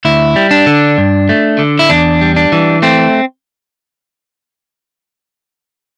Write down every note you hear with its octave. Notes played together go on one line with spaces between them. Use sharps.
D2 E4
G3
D4
D3
G2
A3
D3
E4
E2 D4
G3
D4
E3
A3 C4